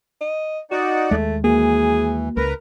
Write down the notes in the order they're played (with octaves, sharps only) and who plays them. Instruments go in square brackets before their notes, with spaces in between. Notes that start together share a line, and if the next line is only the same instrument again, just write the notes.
[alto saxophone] D#5
[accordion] D#4 D5 F#5 [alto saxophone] F#4
[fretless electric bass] D#2 G#3 [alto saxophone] A3
[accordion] E3 [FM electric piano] A#3 F#4 [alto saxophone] G#4
[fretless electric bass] C#2 [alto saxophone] A#4 [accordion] B4 A#5